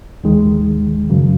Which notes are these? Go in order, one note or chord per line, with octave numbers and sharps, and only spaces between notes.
D#2 D#3 G#3
F#2 C#3 F#3